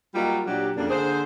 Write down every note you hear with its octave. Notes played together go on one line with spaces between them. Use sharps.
F#3 G3 A#3 D#4 F4 G4
A#2 F#3 D4 G4
F2 C#3 A#3 D4
D3 A#3 G#4 C5